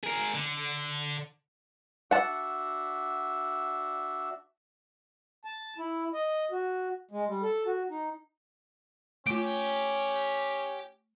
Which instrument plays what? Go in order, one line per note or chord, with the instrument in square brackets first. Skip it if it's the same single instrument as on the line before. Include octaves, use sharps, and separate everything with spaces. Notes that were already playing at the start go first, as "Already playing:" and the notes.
[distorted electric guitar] G#4 A#4
D3
[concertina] D4 F#4 E5 [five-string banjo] F#5 A5
[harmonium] A5
E4
D#5
F#4
G#3
G3
A4
F#4
D#4
[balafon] A3 F4 [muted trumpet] C#4 [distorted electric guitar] G4 [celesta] D7